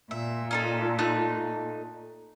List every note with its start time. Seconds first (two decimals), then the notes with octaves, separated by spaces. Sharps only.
0.11 A#2 E5
0.51 C#4 D#4 A4
0.99 A3 D#4 F#6